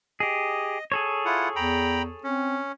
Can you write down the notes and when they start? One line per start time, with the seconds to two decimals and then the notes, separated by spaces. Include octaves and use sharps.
0.20 G4 G#4 D#5
0.92 G#4 A4 C#5
1.25 E4 F4 F#5
1.56 E2 G5 A#5 B5
2.24 C4 C#4